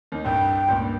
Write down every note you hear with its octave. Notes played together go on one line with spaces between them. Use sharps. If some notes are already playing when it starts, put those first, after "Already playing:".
D#2 D#4
C2 G2 G5
C#2 G2 A#2